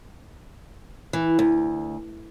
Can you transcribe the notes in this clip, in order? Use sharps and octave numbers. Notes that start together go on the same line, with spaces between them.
E3
D2